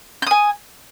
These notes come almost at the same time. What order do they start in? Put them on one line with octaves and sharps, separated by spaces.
G6 D#6 G#5